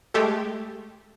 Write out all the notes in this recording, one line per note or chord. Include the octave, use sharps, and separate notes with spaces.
G#3 A3 G4 A4